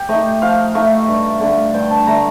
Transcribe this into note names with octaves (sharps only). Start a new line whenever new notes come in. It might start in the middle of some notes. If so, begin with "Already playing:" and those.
Already playing: G4
A3 D#4 D#5
F3 F5
A3 D#4 F5
G2
D3 A3 D4
G2 G5
A5
D3 A3 D4 A#5